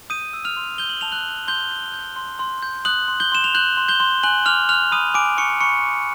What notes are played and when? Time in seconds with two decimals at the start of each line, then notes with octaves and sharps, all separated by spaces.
0.10 D#6 G6 D#7
0.33 E6
0.45 F6 F7
0.57 C6
0.78 G6 G7
0.89 F#7
1.01 A5 F7
1.12 F#6 F#7
1.25 G6
1.47 C6 G6 G7
1.71 G6
1.94 G6
2.16 C6
2.39 C6
2.63 G6
2.85 D#6 F#6 F#7
3.08 C6
3.20 G6 G7
3.32 C6 E7
3.44 F7
3.55 F#6 G6 F#7
3.77 C6
3.88 G6 G7
4.00 C6
4.23 G#5 F#6 F#7
4.46 D6 F6 F7
4.69 F6 F#6 F7
4.91 B5 D#6 D#7
5.14 G#5 D6 D7
5.37 C#6 D6 C#7
5.60 B5 C#6 C#7
5.84 D6